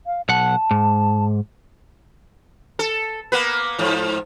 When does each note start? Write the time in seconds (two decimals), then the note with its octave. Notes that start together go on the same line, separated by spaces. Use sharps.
0.06 F5
0.29 B1 F#5 A5
0.71 G#2
2.79 A4
3.32 A#3 B3 B4
3.78 G#2 F3